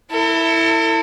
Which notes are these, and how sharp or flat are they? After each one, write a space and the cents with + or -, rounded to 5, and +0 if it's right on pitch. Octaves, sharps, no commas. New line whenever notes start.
E4 +0 A4 +40